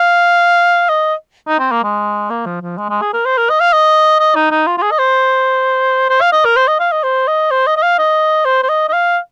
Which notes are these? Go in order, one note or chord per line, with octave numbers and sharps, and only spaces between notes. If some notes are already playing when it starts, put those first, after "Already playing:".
Already playing: F5
D#5
D#4
C4
A#3
G#3
A#3
F3
F3
G#3
G#3
G#4
A#4
C5
A#4
D#5
F5
D#5
D#5
D#4
D#4
F4
F4
G#4
D#5
C5
C5
F5
D#5
A#4
C5
D#5
F5
D#5
C5
D#5
C5
D#5
D#5
F5
D#5
C5
C5
D#5
D#5
F5